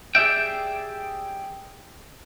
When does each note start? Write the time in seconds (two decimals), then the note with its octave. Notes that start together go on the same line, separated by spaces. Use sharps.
0.15 G4 G#4 D5 E5 G5